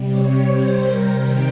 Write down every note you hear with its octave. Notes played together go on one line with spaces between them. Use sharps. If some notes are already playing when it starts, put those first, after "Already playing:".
Already playing: C3 G3
C#5
C3 G3 C5
A#4
C3 D#3 G3 G5